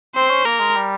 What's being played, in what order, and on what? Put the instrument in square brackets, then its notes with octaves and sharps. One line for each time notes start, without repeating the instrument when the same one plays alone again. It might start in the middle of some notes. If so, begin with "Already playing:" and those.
[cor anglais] C4 [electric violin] C5
[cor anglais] C#4
[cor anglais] A#3 [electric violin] A#4
[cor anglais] G#3
G3